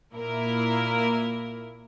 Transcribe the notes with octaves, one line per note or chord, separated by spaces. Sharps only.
A#2 A#3 E4 A#4